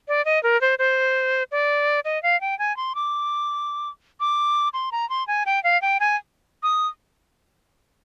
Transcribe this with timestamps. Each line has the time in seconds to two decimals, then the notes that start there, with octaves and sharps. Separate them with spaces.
0.08 D5
0.25 D#5
0.43 A#4
0.61 C5
0.79 C5
1.52 D5
2.05 D#5
2.23 F5
2.41 G5
2.59 G#5
2.77 C6
2.95 D6
4.20 D6
4.73 C6
4.92 A#5
5.10 C6
5.27 G#5
5.46 G5
5.64 F5
5.82 G5
6.00 G#5
6.63 D#6